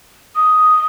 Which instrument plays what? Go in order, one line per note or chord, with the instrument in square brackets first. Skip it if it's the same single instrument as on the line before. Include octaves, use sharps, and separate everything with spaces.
[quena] D#6